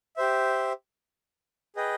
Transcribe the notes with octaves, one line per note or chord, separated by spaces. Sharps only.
G4 C5 E5
G#4 B4 D#5 G5